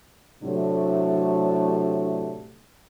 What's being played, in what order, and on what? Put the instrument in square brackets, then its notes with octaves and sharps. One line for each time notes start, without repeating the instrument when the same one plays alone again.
[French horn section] A2 C3 F#3 A3 D4